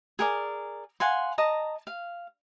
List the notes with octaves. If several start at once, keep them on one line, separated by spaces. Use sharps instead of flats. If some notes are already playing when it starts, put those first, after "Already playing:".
G#4 A#4 D5
F5 F#5 G#5 C6
D#5 A5 A#5
F5